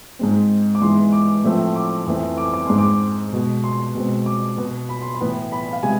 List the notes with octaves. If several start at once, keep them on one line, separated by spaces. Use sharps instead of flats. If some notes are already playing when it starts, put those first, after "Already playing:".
G#2 G#3 C4
D6
G#2 E3 G#3 B3 C6
D6
A2 F3 A3 C4
D6
F2 E3 A3 C4
D6
D6
G#2 G#3 C4 C6
D6
B2 G#3 B3
C6
B2 G#3 C4
D6
B2 B3
B5
C6
B5
A2 E3 B3
B5
F5
C3 G#3 G#5